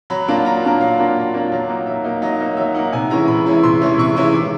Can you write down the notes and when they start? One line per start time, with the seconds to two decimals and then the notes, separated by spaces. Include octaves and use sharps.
0.10 F#3 B5
0.28 A#3 D4 F4
0.45 F#3 A#5
0.63 A#3 D4 F4
0.81 F#3 F5
0.99 A#3 D4 F4
1.17 F#3
1.34 A#3 D4 F4
1.52 F#3
1.69 A#3 D#4
1.86 F#3 E5
2.04 A#3 D#4
2.22 F#3 D#5
2.40 A#3 D#4
2.57 F#3 E5
2.74 A#3 D#4 F#5
2.93 C3 G#5
3.10 E3 G#3 C#4 E4 A#5
3.28 C3 B5
3.46 E3 G#3 C#4 E4
3.63 C3 C6
3.81 E3 G#3 C#4 E4
3.98 C3 C#6
4.16 E3 G#3 C#4 E4
4.34 D#3 D6